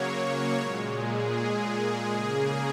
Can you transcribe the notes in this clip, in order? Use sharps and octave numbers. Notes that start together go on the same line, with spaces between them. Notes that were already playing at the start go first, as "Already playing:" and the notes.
Already playing: C#3 F#3 A#3 C#5
A#2 G#3
G#4
C#3 A#3